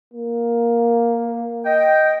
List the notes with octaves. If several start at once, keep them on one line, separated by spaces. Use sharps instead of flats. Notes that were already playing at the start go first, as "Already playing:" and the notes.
A#3
D#5 G5